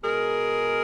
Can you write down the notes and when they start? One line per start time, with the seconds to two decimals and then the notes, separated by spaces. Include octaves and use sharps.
0.03 B2 G#3 G#4 A#4